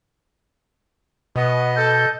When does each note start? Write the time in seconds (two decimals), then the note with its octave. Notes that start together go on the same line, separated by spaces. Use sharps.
1.36 B2 B3 D#5
1.76 A4 G6